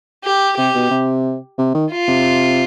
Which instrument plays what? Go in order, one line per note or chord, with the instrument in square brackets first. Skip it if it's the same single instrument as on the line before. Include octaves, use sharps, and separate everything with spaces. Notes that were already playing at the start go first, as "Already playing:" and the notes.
[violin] G4
[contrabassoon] C3 [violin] G4
[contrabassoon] B2
C3
C3
D#3
[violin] F4
[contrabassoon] C3